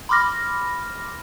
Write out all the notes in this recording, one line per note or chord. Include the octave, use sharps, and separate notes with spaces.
B5 C6 D6 F6 A#6